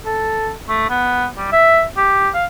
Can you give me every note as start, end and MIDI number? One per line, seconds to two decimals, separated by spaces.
0.06 0.51 69
0.69 0.88 57
0.90 1.26 59
1.37 1.52 55
1.52 1.84 76
1.97 2.29 67
2.34 2.45 77